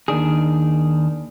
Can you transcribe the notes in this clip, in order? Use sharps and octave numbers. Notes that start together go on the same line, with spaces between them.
D#2 D#3 D4 G#4